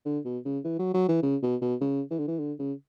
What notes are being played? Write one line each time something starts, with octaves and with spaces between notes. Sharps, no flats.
D3
B2
C#3
E3
F#3
F#3
E3
C#3
B2
B2
C#3
E3
D3
E3
D3
C#3